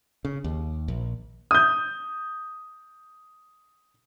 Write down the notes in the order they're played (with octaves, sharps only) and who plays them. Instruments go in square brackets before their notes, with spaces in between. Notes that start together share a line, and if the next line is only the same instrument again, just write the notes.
[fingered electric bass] C#3
D#2
A#1
[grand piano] D#6 G6